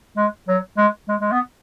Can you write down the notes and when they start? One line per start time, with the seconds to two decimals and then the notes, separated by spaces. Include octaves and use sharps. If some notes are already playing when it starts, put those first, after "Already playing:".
0.17 G#3
0.48 F#3
0.78 G#3
1.09 G#3
1.21 G#3
1.32 B3